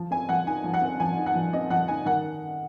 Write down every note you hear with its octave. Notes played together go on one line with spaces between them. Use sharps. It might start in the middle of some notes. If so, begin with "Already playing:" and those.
Already playing: F3
C4 G#5
F3 F#5
D#4 G#5
F3
F#5
C4
F3 G#5
D#4
F#5
F3
C4 D#5
F3 F#5
D#4 G#5
D#3 F#5